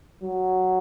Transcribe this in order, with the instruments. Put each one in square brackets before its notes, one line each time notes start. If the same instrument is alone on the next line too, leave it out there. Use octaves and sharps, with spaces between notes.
[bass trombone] F#3